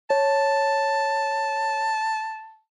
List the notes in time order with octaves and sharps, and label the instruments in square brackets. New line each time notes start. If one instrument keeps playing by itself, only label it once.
[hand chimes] C#5 [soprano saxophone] A5